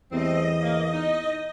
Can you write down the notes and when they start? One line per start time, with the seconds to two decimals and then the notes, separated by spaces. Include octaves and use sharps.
0.12 E2 G3 A3 C4 D#5
0.61 C#3 A#3
0.92 D#4